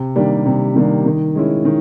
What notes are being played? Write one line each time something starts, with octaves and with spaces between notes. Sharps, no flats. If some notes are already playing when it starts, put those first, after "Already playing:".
Already playing: C3
D#3 G3 A#3 D4
C3
D#3 G3 A#3 D4
D#3
G#3 C#4 E4
D#3